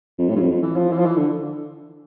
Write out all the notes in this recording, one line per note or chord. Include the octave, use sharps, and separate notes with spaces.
F2
A2
G2
F2
F2
E3
F3
E3
F3
E3
D3